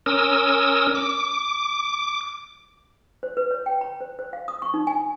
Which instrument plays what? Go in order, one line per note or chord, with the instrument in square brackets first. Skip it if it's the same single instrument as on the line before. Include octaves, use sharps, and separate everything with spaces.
[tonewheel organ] C#4 A#4 D#6 E6
D6
[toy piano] C5
B4
C#5
G5
A#5
C5
C5
F5
D#6
C#6
D#4
G#5